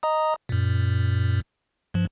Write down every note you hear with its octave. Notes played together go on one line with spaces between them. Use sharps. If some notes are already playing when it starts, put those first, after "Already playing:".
D#5 A#5 D#6
F#2 A#2
G2 F3